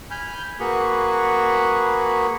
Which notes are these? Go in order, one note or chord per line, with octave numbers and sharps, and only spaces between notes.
G#5 B5 F6 G6
A#3 F#4 G#4 B4 B5 C#6